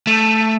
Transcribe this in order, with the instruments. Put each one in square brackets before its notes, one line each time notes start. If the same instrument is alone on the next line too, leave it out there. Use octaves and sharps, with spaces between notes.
[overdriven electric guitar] A3